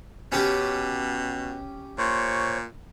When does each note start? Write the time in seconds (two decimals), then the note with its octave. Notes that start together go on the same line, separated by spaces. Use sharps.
0.32 B2 C#4 G4
1.98 A#2 C5 C#5 C#6